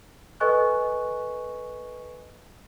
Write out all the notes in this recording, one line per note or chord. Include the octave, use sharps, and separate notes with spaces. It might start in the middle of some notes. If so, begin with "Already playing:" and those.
A4 B4 D#5 G#5 C#6 F#6